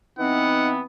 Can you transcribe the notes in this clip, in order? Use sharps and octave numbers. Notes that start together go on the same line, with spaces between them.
E3 B3 C4 D#4 F#5